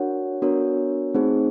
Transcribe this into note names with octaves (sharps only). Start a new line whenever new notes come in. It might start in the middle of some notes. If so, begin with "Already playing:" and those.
Already playing: D4 F#4 A#4 C#5 F#5
B3 D4 F#4 A#4 C#5
A3 C4 D#4 G#4 C5